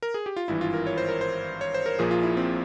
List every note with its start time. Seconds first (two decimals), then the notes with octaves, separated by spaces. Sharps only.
0.02 A#4
0.14 G#4
0.26 G4
0.36 F4
0.48 G#1 G2 E3 E4
0.61 F4
0.74 A#4
0.87 C#5
0.98 C5
1.08 A#4
1.21 C5
1.61 C#5
1.74 C5
1.86 A#4
1.99 A#1 A#2 F3 A#3 G#4
2.11 F4
2.23 E4
2.37 C4